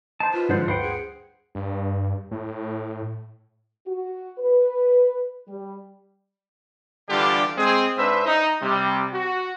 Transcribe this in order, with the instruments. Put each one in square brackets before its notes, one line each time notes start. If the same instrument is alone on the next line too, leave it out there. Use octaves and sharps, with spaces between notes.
[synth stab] D#4 C5 [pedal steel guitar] A5
[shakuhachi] F4 [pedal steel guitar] B4
[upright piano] G#2 D3 F3 [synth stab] C5 F#5 A5
[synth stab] D2 G2 [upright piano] B4 [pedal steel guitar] C5 F#5 G5
[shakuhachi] G#4
[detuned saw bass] G2
A2
[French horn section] F#4
B4
G3
[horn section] D3 E3 G3 D4 F4 G4
G#3 C4 G#4
G#2 D4 B4 C5 E5
D#4
C3 G3
F#4